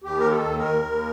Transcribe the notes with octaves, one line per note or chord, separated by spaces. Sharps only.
D#2 G4
D#3 A#4
A4
D#2
A#4
D#2
D#2